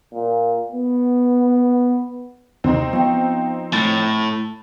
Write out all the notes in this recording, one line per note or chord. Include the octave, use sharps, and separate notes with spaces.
A#2
B3
D#2 C3 C4 D#4
F3 B3 G5
A2 A6